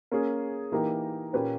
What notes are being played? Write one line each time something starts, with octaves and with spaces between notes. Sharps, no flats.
A#3 C#4 G#4
E3 A#3 D#4 G4 A#4
A#2 A#3 C#4 G4 B4